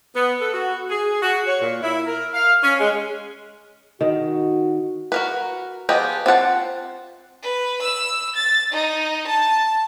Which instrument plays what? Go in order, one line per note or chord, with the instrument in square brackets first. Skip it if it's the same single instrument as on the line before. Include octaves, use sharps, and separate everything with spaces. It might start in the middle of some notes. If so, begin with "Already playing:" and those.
[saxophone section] B3
A4
F#4
G#4
F#4
C#5
A#2
E4
A#4
F5
C#4
G#3
[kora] D#3 [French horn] F#4
[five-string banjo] F#4 A#4 B4
F3 B3 G4 G#4 D#5
C4 F4 F#5 A5
[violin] B4
E6
A6
D#4
A5